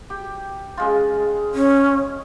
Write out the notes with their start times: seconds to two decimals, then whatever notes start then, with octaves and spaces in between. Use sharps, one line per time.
0.10 G4
0.77 C#3 G#3 F4
1.55 C#4